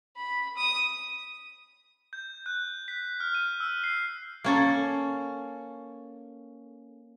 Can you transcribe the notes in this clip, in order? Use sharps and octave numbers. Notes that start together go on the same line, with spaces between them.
B5
D#6
G6
F#6
B6
F6
D#7
E6
C7
A#3 C#4 A4